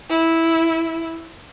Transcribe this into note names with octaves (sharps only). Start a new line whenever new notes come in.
E4